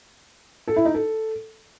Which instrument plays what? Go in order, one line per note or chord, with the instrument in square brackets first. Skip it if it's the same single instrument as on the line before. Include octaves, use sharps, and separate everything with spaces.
[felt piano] A4
E4
D#4
A4